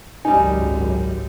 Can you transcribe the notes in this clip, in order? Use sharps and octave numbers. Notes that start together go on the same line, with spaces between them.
G#1 C#2 F#2 G3 D#4 G#5